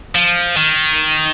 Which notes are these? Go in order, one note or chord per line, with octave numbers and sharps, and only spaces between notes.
F3
D#3